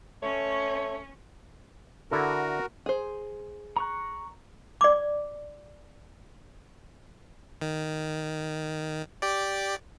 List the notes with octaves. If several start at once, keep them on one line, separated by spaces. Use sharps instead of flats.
A3 C#4 C#5
D3 E4 F#4 A4 A#4
G#4 C5
A#5 C#6 F#6
D5 D6
D#3
G4 D5